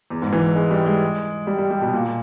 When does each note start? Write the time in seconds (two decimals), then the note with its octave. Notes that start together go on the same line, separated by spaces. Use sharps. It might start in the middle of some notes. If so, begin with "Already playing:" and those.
0.10 E2
0.22 G#2
0.32 E3
0.55 G#3
0.71 G3
0.86 G#3
1.47 G3
1.58 G3
1.71 G3
1.81 B2
1.93 A#2